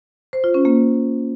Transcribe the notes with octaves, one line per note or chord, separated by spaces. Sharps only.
C5
F4
C#4
A#3